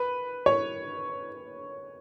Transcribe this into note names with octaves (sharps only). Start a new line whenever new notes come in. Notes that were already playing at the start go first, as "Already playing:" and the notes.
Already playing: B4
C#5